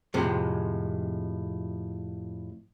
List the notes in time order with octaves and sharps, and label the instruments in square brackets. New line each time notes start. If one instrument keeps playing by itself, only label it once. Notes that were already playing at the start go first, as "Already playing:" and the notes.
[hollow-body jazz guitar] F2 A2 C3 G#3